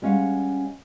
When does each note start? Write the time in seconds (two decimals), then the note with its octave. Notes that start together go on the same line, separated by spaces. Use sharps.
0.02 G3 G#3 C#4 F5 F#5